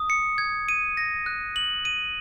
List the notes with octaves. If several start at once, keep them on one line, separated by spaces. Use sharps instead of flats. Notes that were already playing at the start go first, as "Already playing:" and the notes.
Already playing: D#6
C#7
G#6
D#7
A#6
F#6
F#7
D#7